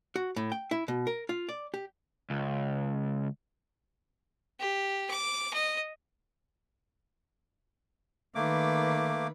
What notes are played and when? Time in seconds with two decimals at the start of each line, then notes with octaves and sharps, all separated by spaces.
0.16 F#4
0.36 A2
0.52 G5
0.71 E4
0.88 B2
1.07 A#4
1.29 F4
1.49 D5
1.74 G4
2.30 C#2
4.59 G4
5.10 D6
5.54 D#5
8.35 D#3 A3 A#3 B4 D6